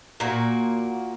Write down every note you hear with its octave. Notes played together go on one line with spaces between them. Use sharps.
A#2 A#3 F#4